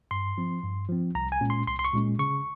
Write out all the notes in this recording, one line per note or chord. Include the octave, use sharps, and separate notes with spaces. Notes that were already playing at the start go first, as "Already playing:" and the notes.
G2 C6
F3 C4
G2
F3 C4
C2 A#5
G#5
A#2 G#3 C#4
C6
C2 C6
C6
C#6
A#2 G#3 C#4
C#3 C#6